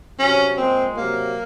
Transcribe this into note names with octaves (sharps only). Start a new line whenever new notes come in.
C3 F#3 C#4
A#2 G#3 C4
C3 F#3 A#3